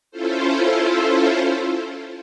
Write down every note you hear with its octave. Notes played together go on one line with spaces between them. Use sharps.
C#4 E4 F4 A4 C5